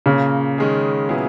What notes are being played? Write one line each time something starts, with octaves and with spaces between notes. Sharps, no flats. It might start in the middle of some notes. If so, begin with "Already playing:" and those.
A#2 C#3 A#3 C#4
D#3 G#3 C#4 G#4
A#2 F#3 B3 E4 G#4